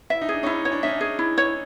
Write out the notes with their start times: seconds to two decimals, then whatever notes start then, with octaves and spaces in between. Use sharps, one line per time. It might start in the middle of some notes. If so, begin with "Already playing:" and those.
0.10 E4 E5
0.21 D#4
0.29 D4 G#4
0.43 C#4 D#4 E4
0.65 C#5
0.72 D4
0.83 C#4 D#4 E5
1.01 G#4
1.19 E4
1.38 C#5